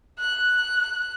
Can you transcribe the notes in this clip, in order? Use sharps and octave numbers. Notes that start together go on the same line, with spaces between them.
F#6